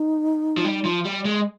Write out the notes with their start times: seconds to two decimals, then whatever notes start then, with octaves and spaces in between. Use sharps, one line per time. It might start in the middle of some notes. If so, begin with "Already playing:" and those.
Already playing: D#4
0.57 F3
0.65 G3
0.85 F3
1.05 G3
1.25 G#3